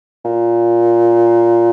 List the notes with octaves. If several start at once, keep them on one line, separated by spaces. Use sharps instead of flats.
A#2